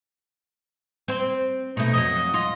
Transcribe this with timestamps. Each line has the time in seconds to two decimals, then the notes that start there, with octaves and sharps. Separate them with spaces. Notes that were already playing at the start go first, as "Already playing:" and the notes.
1.08 C4 C5
1.77 B2 A3 D#4
1.94 F2 F#3 D#5
2.34 F4 D#5